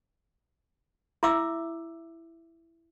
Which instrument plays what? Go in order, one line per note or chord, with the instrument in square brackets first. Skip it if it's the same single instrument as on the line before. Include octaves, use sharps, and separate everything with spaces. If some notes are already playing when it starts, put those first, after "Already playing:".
[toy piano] E4 E5 D6 E6